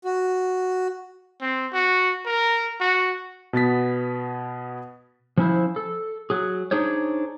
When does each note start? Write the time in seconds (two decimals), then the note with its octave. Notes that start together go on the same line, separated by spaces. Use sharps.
0.04 F#4
1.41 C4
1.73 F#4
2.26 A#4
2.80 F#4
3.53 B2 B3 A6 B6
5.37 F3 C#4 E4 C5
5.76 A4
6.30 F#3 G#4
6.71 D4 D#4 G#4 C5 C#5